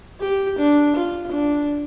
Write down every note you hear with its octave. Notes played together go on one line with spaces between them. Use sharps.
G4
D4
F4
D4